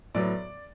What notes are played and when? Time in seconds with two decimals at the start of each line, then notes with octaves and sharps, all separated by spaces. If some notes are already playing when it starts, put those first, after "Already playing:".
0.14 A2 F#3 B3 D5